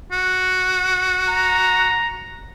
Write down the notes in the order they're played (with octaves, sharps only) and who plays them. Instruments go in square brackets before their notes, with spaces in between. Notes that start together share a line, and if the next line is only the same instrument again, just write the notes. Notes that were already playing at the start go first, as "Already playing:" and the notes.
[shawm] F#4
[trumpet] A#5